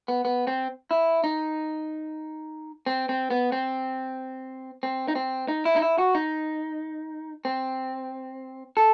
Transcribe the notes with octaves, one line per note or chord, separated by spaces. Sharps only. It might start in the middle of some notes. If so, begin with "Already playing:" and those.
B3
B3
C4
E4
D#4
C4
C4
B3
C4
C4
D#4
C4
D#4
E4
D#4
E4
F#4
D#4
C4
A4